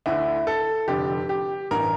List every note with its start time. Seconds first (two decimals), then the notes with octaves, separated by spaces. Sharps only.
0.06 D2 D3 E4
0.47 A4
0.88 F1 F2 D3 G4
1.29 G4
1.71 A1 G2 E3 A#4